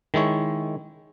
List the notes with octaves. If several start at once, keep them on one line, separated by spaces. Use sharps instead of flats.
D#3 G#3 E4 C#5